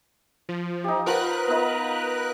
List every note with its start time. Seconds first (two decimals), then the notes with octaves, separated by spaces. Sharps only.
0.49 F3
0.84 D#4 G4
1.06 F3 F4 A#4 B4 F#5 F#6
1.47 B3 D#4